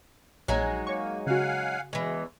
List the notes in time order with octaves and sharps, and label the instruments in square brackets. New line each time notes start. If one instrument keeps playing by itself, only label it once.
[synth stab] A#1 G#6 [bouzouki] F#3 G#3 D#4
[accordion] A#3 [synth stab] C#5 C#6
[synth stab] C#3 F#4 [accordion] F5 F#5 G#5
[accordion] E2 [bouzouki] E3 G#3